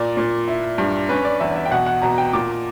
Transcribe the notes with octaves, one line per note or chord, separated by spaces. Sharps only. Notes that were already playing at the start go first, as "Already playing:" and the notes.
Already playing: A#2 D5
A#2
E4
G2
C#4 B4
D5
E2 E5
E5
G5
B2 F#5
F#5
B2 A#5
G5
A#2 D6